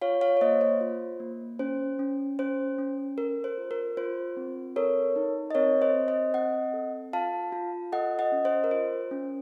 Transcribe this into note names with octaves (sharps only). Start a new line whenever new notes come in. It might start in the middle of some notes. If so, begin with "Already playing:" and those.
F4 C#5 F5
C#5 F5
C#5
A#3 C5 D#5
C5
F4
A#3
C#4 C5
C#4
C#4 C5
C#4
A4 A#4
C5
F4
A#4
F4 C5
C4
A4 A#4 C#5
D#4
D#5
C4 A#4 C#5
C5 D#5
C4
C5 D#5
C4 D#5 F#5
A4
F4 F5 A5
F4
A4 D#5 F#5
D#5 F#5
C#4
C5 D#5
A#4
F4 C5
C#4